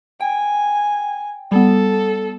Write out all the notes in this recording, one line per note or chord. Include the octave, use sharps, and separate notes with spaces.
G5 G#5
G3 B3 A4